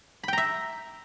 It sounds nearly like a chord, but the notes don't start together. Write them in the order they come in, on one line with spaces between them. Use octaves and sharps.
B5 G5 A#5 E5